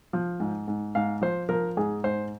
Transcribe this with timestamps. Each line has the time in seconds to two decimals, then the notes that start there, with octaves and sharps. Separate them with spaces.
0.13 F3
0.40 G#2
0.68 G#2
0.95 G#2 F5
1.21 F3 C5
1.49 F3 A#4
1.77 G#2 G#4
2.04 G#2 C5